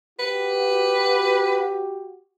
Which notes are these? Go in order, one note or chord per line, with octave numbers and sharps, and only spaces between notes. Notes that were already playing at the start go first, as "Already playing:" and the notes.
F#4 G4 B4